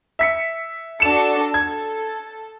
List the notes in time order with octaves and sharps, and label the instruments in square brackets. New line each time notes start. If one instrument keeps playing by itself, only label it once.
[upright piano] E5 B6 C#7
[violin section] D4 F#4 A4 [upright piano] C#7 E7
[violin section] A4 [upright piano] G#6